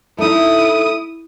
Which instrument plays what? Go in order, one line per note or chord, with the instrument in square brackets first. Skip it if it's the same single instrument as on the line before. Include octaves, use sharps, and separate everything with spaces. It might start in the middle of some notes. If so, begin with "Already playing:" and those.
[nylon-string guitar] A3 D#4 [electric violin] E4 D#6